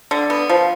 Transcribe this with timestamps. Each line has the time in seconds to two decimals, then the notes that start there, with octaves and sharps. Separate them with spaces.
0.11 D3
0.30 B3
0.49 F3